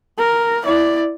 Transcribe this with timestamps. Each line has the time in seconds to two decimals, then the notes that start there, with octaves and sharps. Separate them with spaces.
0.18 A#4
0.62 E4 D5